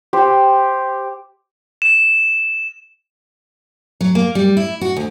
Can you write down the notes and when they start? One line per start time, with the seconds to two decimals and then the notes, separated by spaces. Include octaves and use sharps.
0.13 G4 C5
1.82 E7
4.01 F#3
4.15 A#3
4.35 G3
4.57 E4
4.81 F#4
4.96 D2